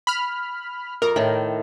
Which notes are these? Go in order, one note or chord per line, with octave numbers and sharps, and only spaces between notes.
B5 F6
F2 A#4
A2 D#3